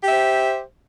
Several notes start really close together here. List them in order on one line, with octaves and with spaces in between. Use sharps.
G4 E5 C5